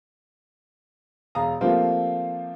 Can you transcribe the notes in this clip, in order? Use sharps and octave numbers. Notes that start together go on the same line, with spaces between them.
E1 F5 A#5 D#6
F3 A3 A#3 C4 F4 G4